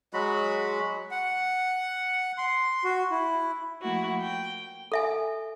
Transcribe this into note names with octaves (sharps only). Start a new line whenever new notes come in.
F#3 G#3 F#4 B5
F#5
C6
F#4
E4
F3 A3 A#3 E4 F#4
G5
A4 E5 G#5